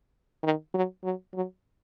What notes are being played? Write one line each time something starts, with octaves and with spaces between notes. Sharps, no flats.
D#3
F#3
F#3
F#3